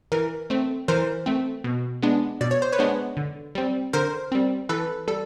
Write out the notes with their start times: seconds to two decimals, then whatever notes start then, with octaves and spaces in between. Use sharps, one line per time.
0.12 E3 A#4
0.50 A3 C4
0.88 E3 A#4 C5
1.26 A3 C4
1.64 B2
2.03 G#3 B3 D4
2.41 B2 D5
2.51 C#5
2.62 C5
2.73 B4 C#5
2.79 G#3 B3 D4
3.17 D3
3.55 G3 C4
3.93 D3 A#4 C5
4.32 G3 C4
4.69 E3 A4 B4
5.08 G3 A4